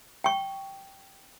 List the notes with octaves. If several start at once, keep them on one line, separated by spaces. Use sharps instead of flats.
G5 C#6